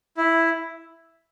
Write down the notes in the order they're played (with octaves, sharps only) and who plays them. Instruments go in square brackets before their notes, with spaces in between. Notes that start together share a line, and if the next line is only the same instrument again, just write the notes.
[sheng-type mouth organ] E4